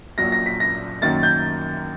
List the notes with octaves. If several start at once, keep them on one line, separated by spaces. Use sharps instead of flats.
A#1 A#2 F#3 A#6
A#6
B6
A#6
F#2 D#3 F#3 A#3 A6
G6